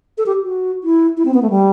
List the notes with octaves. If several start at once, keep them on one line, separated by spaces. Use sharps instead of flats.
A4
G4
F#4
E4
E4
C4
B3
A3
G3